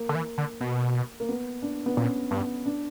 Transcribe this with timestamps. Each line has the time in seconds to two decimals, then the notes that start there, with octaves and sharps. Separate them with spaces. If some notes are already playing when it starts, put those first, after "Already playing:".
Already playing: A#3
0.09 D3
0.15 E3
0.38 D3
0.61 B2
1.20 A#3
1.29 B3
1.62 D4
1.86 B3
1.97 A#2 C#4
2.31 G2 B3
2.66 D4